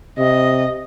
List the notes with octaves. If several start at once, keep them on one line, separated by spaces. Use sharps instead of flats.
C3 D#5